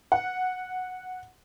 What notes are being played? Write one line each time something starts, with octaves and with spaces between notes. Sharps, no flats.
F#5